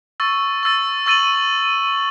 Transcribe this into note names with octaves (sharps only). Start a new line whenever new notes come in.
C#6 E6 A6
C#6 E6 A6
C#6 E6 A6 D#7 F#7